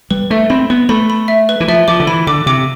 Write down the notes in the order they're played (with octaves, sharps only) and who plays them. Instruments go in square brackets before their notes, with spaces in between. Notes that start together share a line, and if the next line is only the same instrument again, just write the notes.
[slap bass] G3 [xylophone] B4
[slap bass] A3 [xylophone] E5
[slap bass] C4 [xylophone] B5
[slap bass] B3 [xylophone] B4
[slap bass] A3 [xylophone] B5
[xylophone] B5
E5
B4
[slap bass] E3
[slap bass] F3 [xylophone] E5
[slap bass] F3 [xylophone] D6
[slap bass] D3
[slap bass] E3 [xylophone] B5
[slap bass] D3 [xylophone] D6
[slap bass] C3 [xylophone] D6